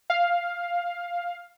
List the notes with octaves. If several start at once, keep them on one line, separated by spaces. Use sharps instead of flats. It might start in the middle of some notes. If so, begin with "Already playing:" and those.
F5